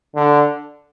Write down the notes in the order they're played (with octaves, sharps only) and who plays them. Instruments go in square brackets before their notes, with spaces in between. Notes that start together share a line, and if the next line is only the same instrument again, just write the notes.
[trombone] D3